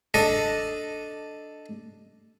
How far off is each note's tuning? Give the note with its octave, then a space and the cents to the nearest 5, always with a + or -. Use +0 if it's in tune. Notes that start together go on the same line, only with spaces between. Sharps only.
D4 +0 A4 +0 D#5 +0